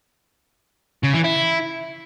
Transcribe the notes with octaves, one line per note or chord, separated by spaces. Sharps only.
C#3
E3
E4